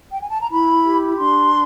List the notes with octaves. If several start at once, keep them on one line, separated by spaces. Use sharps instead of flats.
G5
G#5
A5
A#5
E4 B5
G4
D4 C6